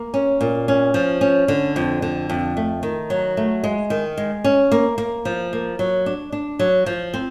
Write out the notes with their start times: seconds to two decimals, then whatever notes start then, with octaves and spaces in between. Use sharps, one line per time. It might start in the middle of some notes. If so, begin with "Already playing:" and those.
Already playing: A#3
0.14 C#4
0.41 A#2
0.68 C#4
0.94 F3
1.21 C#4
1.48 D3
1.76 F2
2.02 D3
2.30 F2
2.57 A3
2.83 D#3
3.10 F#3
3.37 A3
3.64 G#3
3.90 D#3
4.18 G#3
4.44 C#4
4.72 A#3
4.98 A#3
5.25 F3
5.53 A#3
5.79 F#3
6.06 D4
6.32 D4
6.59 F#3
6.86 F3
7.14 C4